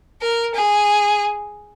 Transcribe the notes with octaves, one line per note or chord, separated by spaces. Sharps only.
A#4
G#4